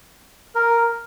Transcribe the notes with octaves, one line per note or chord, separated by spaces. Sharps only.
A#4